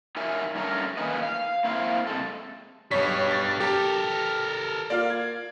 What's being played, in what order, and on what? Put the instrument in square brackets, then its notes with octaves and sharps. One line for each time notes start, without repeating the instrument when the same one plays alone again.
[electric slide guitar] D#4 A#4 C#5 E5 G#5
G2 A3 C#4 D4 A#4
D#3 A#3 C#4 G#4 B4 D#5
F5
A#3 C4 E4 C5 F5
C3 G#3 A4
[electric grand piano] B1 B6 [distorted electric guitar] G2 G3 [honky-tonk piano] C#5
[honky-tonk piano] A6
[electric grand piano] G4 [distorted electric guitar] A4 A#4
[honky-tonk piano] A#3 F4 F5 [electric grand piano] D5
[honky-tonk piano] G#6